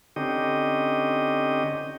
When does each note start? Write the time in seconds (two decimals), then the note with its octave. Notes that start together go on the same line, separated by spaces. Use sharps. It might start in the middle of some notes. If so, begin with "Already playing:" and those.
0.16 D3 C4 C#4 D#4 G4 D#5